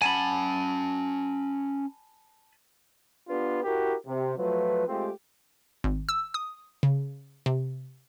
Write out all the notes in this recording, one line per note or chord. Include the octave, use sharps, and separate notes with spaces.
C#4 F#5 G#5 A5 B5
B3 D4 F4 G4 B4
E4 F#4 G4 A#4
C3
F3 F#3 A3 F4 B4
G#3 A3 C4 F4 G4
G#1
E6
D#6
C#3
C3